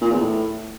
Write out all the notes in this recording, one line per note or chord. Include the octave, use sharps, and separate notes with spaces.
A#2
E2
A2